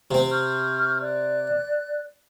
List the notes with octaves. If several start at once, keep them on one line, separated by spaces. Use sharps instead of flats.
C3 C4 F4
C#6 F6 G6
D5 F#6